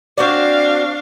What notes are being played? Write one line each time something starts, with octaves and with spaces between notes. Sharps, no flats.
C4 D4 F#4 D5 F5